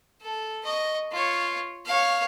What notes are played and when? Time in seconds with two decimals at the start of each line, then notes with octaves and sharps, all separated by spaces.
0.22 A4
0.65 D#5 C#6
1.12 F4 C#5
1.86 C#5 F5